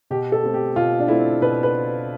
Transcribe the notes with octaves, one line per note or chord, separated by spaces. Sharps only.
B2 G4
A4
A3 C4
G4
B2 F4
D4
A3 C4 E4
B2 B4
B4